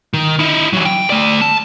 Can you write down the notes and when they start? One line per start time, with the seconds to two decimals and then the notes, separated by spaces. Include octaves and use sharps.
0.14 D#3
0.39 D#4 E4
0.73 E3 F#3
0.85 G5
1.10 A3 D5
1.41 A5